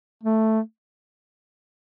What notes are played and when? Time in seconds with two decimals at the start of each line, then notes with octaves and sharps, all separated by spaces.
0.23 A3